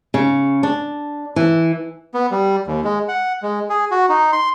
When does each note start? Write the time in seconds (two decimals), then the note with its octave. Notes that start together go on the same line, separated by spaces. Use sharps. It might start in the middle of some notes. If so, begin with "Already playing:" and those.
0.14 C#3
0.63 D4
1.36 E3
2.14 B3
2.31 G3
2.67 D#2
2.84 G#3
3.08 F#5
3.42 G#3
3.70 G#4
3.91 F#4
4.09 D#4
4.33 C6